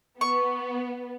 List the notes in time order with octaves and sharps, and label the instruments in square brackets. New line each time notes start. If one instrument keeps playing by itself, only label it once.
[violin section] B3 [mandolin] C#6